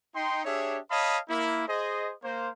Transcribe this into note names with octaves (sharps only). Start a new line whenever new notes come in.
D#4 G5 C6
D4 G4 G#4 C#5 E5
C#5 D#5 F5 A5 B5 D#6
A#3 E4
G#4 C5 D#5
A#3 C5